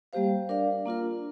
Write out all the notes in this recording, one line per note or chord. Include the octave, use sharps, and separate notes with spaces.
G3 A#3 G4 C5 F5
D4 A#4 D5 F5
A#3 D4 F4 A#4